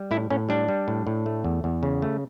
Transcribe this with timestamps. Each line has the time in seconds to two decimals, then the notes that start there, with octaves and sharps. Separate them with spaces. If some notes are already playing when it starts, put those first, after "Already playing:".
Already playing: G3
0.11 A2 E4
0.30 A2 C#4
0.49 G3 D4
0.68 G3
0.88 A2
1.07 A2
1.26 A3
1.44 E2
1.64 E2
1.83 C#3
2.02 A3